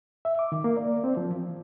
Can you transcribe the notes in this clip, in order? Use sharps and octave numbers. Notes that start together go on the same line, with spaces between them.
E5
D6
D#3
A#3
D5
C4
F3
E3